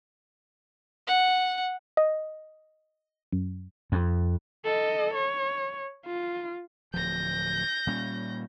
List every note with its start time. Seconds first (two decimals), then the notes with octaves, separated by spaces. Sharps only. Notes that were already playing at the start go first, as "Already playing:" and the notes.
1.07 F#5
1.97 D#5
3.32 F#2
3.92 F2
4.65 A4 D#5
5.14 C#5
6.06 F4
6.94 D1 F3 G6 A#6
7.87 A#2 G3 C#4